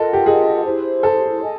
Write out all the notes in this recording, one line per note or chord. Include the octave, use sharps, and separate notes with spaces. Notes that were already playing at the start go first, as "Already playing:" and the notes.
Already playing: F4 A4 A#4 D#5 F#5
G4
G#4
E4 G4 C5
A4
D#5 G#5